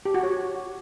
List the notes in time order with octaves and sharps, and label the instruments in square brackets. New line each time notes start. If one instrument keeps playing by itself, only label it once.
[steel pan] G4
F#4
C#5